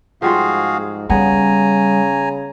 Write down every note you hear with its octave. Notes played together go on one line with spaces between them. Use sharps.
G#2 F3 G3 F4 F#4 G#4 F5
C#3 G3 B3 G#5 A#5